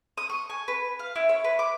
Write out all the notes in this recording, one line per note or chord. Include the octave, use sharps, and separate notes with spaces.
D#6
C#6
G#5
B4
F5
E4
C#5
B4
D6